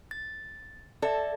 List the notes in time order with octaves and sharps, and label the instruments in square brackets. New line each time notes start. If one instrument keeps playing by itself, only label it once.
[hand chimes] A6
[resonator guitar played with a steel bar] A4 [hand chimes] D5 E5